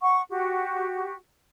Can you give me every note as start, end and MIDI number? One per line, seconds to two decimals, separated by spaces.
0.01 0.22 78
0.01 0.22 85
0.30 1.14 66
0.30 1.14 67